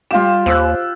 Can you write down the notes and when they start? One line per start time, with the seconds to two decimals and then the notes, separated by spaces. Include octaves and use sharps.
0.11 G3 F4 G4 F5 E7
0.46 D#2 C5 E6 F#6